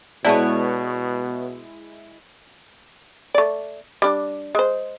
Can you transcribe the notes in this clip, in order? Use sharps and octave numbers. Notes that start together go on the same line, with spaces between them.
B2 G#3 B3 E4 C#5 D5 A5
A3 D5
G3 D4
G#3 C5